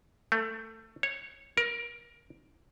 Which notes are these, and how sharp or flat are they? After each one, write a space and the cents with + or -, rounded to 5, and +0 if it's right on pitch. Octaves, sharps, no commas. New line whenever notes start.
A3 +20
C#5 -10
A#4 +20